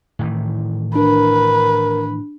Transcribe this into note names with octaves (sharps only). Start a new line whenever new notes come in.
A2 D#3 E3
D4 A#4 B4